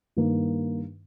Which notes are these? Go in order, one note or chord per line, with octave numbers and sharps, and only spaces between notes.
G2 D#3 A#3